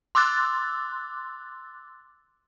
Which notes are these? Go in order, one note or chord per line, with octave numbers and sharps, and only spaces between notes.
C6 D6 E6 F#6 A6